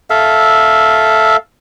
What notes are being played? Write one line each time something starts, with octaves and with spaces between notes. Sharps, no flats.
A4 E5 F5